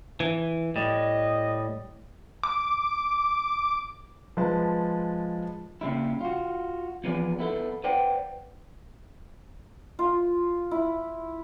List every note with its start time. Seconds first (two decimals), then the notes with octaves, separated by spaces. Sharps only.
0.20 E3
0.76 A2 G3 D#5
2.43 D6
4.37 F3 G#3 B4 A5
5.81 A#2 C#3 G3 E4
6.21 F4 F#4
7.04 E2 F3 B3 G#4 D5
7.39 B3 E4 A4
7.84 B4 C5 D5 F#5 G5
9.99 F4
10.71 E4